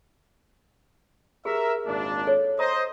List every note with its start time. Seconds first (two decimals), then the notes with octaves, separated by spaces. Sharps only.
1.45 G4 G#4 A#4 E5
1.87 G#1 A#2 D4
2.27 A4 C#5
2.59 C5 D#5 A#5 D#6